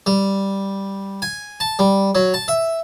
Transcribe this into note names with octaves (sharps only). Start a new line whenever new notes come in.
G3
G#5
A5
G3
F#3
A5
E5